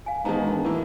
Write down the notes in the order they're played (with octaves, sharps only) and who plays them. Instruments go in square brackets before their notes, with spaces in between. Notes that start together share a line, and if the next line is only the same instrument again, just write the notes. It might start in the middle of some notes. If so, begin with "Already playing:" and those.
[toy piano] F5 G#5
[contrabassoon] G#2 [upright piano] D#3 E3 B3 [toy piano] A5 A#5
[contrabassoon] E1
[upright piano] A2 A#3 [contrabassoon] E3